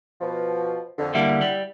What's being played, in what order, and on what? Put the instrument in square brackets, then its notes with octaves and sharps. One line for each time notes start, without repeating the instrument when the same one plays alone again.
[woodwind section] B2 F3
F2 D3
[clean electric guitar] D3 G3 A#3 [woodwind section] E4 E5 F#5
[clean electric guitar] G3